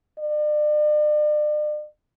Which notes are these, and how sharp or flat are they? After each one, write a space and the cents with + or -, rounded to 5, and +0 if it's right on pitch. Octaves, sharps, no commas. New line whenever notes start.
D5 +40